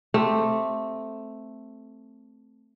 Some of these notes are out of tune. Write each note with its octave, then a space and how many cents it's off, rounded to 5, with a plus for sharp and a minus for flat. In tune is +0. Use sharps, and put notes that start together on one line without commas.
A3 +0 C4 +0 G4 +0